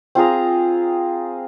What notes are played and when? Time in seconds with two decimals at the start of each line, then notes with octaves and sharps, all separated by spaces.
0.15 C4 F4 G#4 A#5